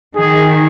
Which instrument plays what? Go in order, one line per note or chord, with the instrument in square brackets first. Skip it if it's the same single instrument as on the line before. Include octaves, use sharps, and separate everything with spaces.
[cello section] D#3 [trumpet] G#4